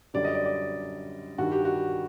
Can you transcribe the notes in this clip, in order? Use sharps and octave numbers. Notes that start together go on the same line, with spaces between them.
F#2 D3 G3 D5
D#5
D5
D5
G2 D#3 G3 F#4
G4
F#4